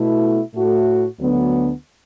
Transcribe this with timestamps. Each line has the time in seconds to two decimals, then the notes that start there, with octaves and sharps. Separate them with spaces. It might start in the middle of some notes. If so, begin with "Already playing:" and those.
Already playing: B2 A3 E4
0.53 A2 A3 F#4
1.18 D2 D3 F#3 B3 D4